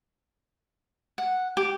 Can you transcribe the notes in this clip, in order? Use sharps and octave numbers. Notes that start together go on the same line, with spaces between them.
F#5
G4